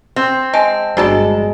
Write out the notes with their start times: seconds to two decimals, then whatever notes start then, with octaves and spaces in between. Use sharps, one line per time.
0.16 C4
0.54 G#3 A5
0.97 G1 G3 G#3 D4 F#4 A4 A5